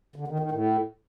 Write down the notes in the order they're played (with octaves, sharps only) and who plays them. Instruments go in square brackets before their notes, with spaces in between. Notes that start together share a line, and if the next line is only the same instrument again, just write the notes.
[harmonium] D3
D#3
D#3
A2